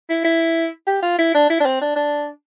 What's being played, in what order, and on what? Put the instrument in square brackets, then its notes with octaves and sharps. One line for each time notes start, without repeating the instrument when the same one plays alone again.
[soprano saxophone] E4
E4
G4
F4
E4
D4
E4
D4
C4
D4
D4